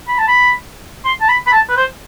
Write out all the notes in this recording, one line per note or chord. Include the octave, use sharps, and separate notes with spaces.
B5
A5
B5
C6
A5
B5
B5
A5
B4
C5